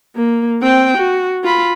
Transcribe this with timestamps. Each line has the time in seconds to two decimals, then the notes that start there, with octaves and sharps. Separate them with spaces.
0.16 A#3
0.62 C4 G5
0.98 F#4
1.44 F4 B5